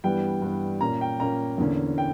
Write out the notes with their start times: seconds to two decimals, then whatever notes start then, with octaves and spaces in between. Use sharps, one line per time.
0.04 G2 E3 G3 B3 G5
0.42 G2 E3 G3 B3
0.81 A#2 A#3 C#4 A#5
1.01 G5
1.20 A#2 A#3 C#4 A#5
1.58 E2 D3 A#3 C#4
1.98 G5